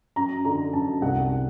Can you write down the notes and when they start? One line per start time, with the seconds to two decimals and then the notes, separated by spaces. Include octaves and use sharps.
0.16 F#2 A#5
0.45 D3 A#5
0.73 F#2 A5
1.02 C2 F#5